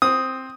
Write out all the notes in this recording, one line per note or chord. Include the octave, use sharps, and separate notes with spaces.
C4 D#6